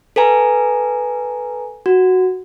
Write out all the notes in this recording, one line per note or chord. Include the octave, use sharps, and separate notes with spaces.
A4 B4 G#5 A#5
F#4